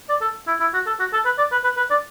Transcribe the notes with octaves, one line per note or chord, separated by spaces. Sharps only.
D5
A4
E4
E4
F#4
A4
F#4
A4
B4
D5
B4
B4
B4
D5